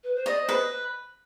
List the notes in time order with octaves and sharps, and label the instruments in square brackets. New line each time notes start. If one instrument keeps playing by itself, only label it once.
[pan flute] B4
C5
[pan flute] D5 [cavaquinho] D#5
[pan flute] C5
[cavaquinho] B4